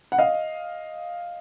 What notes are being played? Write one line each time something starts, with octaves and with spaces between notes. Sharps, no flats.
F#5
D#5 F5